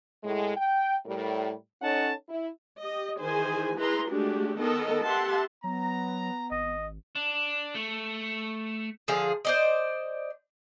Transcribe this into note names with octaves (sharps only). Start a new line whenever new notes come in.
A2 G#3
G5
A2 G3 A#4
C#4 D#4 A4 C#5 F#5 A5
E4
G4 D#5
D#3 E3 G#4 C5 G#5
E4 G#4 B4 A#5 C6
G#3 A3 D4 F#4 G4
D#3 B3 A4 A#4 D#5
G4 E5 F#5 A5 C6
F#3 B3 A#5
G#1 D#5
D4
A3
D3 F3 G#4 F5
C5 D5 D#5